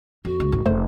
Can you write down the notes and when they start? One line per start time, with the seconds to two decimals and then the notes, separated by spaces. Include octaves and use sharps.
0.25 F2 F#4
0.40 C#2
0.52 G#1 F#2
0.66 F1 A3 C5